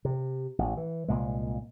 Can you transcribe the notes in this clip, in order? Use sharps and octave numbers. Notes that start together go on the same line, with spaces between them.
C3
A1
E3
C2 A#2 G#3